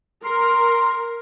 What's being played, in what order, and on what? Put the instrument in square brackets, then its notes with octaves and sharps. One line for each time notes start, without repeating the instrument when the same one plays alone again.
[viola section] A#4 [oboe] C6